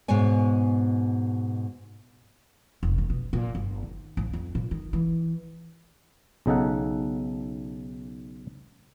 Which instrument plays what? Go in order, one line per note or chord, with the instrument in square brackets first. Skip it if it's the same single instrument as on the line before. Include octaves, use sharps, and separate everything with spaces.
[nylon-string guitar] G#2 B2 C#5 G#5
[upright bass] F1
A3
B2
A#2
G1
D#3
A1
F2
A#2
D#3
E3
[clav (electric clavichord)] B1 C#3 D#4 A4 F#5